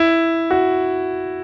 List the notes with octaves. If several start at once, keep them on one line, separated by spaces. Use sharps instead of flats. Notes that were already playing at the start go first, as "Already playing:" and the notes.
Already playing: E4
F#4